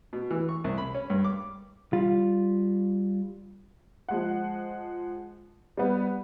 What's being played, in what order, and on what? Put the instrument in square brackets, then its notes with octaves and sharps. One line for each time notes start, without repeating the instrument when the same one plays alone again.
[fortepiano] B2
E3
C#6
C2
B5
C#4
G2
D6
[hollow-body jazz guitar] G3 F4
[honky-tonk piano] F3 G#3 F#5
G3 B3